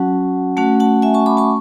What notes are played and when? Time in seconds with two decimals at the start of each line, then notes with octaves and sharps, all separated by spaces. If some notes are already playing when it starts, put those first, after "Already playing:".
Already playing: F#3 C#4 F#4 F#5 A5
0.57 A3 C#4 F#4 F#5 A5
0.80 F#5 A5
1.02 E5 G#5
1.14 A5 C#6
1.26 B5 D6
1.37 A5 C#6